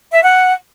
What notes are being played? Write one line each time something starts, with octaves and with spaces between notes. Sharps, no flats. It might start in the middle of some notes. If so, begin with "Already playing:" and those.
E5
F#5